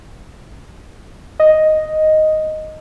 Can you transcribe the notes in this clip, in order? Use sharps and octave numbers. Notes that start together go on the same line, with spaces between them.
D#5